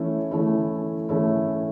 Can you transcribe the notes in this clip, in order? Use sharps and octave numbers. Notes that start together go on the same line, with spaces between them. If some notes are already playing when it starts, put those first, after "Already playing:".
Already playing: E3 A3 C#4 E4
E3 A3 C#4 E4
E3 A3 C#4 E4